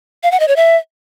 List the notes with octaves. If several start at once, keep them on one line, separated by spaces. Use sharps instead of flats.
F5
F#5
D#5
C#5
E5